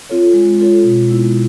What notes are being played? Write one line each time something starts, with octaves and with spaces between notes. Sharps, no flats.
C4 F4 A4 C#5
G#3
C4 F4 A4 C#5
B2
G#3 B3 E4
B2